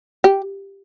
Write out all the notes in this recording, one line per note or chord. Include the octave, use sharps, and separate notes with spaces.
G4